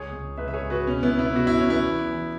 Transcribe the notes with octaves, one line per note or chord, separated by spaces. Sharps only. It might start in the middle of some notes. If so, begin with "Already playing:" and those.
Already playing: C#2 G#4 C#5
C#2
C#2 B4 E5
E5
G#4 C#5
C#2
F#4 B4
B2 C#4
B3 E4
B2
B3 E4
B2 F#4
E4
E2 C#4
B3 E4
E2
E3